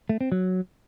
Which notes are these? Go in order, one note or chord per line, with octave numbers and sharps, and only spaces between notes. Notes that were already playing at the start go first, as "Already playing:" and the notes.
A3
C4
F#3